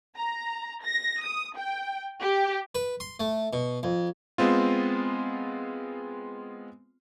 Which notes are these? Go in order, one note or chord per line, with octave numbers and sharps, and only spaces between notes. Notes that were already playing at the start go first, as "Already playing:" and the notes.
A#5
A#6
D#6
G5
G4
B4
C6
A3
B2
F2
G#3 B3 C4 F4